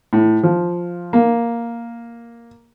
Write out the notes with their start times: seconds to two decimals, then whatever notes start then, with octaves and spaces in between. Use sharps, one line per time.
0.13 A2
0.43 F3
1.13 A#3